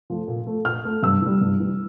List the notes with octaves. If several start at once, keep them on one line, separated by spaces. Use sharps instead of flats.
F3 A3
A#2
A3
A#2 F6
A3
G2 E6
E3 G3
G2
E3 G3